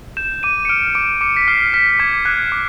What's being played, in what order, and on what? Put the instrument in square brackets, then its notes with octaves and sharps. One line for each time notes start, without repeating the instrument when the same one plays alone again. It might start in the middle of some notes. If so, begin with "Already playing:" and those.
[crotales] G6 E7
D6 D#7
C#7
F6 D7
D6 D7
D6 C#7
B6
F6 C7
F6 B6
D6 G#6
F#6 G#6
D6